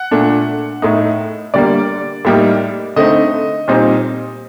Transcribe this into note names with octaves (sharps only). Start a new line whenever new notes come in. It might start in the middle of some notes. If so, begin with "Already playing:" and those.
Already playing: F#5
A#2 A3 D4
A2 A3 D#4
D3 G3 A#3 D5
A2 G3 A#3 D#4
D3 A3 C4 D#4 D#5
A#2 G3 C4 D#4